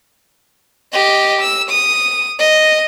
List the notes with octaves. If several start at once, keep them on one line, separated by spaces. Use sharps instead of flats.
G4 D#5
E6
D#6
D#5